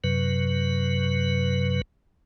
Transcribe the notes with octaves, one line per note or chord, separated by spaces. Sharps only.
F#2 C3 F#3 B4